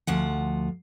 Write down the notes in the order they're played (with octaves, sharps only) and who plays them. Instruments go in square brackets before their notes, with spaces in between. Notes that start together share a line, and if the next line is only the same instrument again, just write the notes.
[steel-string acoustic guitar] D2 F3 F#5